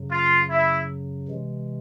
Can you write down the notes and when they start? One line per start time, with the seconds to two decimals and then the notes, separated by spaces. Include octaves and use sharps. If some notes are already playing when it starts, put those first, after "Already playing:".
Already playing: F#2 C#3 F#3
0.11 F4
0.50 E4
1.28 C3 E3 G#3